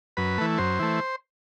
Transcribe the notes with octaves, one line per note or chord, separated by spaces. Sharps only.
F#2 B4
E3 A3
F#2 C5
E3 A3